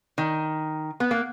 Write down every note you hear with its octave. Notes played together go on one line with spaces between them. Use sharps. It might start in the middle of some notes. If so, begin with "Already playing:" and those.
D#3
B3
A#3